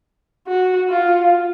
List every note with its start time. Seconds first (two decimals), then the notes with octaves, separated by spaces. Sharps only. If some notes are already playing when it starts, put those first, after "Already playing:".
0.47 F#4
0.89 F4